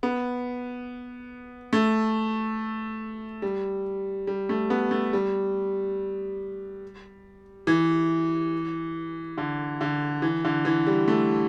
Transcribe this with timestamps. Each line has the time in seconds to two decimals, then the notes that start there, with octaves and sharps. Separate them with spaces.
0.03 B3
1.73 A3
3.42 G3
4.27 G3
4.49 A3
4.70 B3
4.91 A3
5.13 G3
7.67 E3
9.38 D3
9.81 D3
10.22 E3
10.45 D3
10.65 E3
10.87 G3
11.08 A3